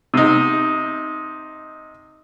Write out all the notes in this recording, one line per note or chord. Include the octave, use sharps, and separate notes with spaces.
C3 D#4